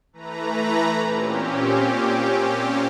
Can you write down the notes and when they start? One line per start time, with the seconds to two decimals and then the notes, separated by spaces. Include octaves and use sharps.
0.13 E3 A3 B4 A#5
1.01 A#2 C4 C#4 G4